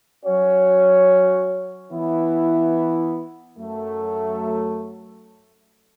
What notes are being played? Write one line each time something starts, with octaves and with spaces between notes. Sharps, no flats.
F#3 C#4 F#4 C#5
E3 B3 E4
F#2 F#3 A3